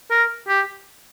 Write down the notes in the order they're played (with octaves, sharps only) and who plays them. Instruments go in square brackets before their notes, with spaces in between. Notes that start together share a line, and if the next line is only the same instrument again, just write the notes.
[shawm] A#4
G4